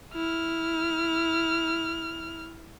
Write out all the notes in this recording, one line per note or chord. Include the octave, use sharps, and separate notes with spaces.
E4 F6